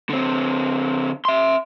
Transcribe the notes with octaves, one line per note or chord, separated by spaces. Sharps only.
D3 C4
E5 C6